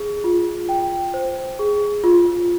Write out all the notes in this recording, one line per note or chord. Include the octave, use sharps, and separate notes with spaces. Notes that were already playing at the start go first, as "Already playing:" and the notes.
Already playing: G#4
F4
G5
C5
G#4
F4